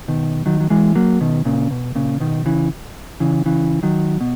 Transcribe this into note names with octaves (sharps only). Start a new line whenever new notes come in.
B2 D#3
D#3 F#3
F#3
E3 G#3
F#3 A#3
B2 D#3
A#2 C#3
B2
A#2 C#3
B2 D#3
C#3 E3
C#3 E3
C#3 E3
D#3 F#3
B2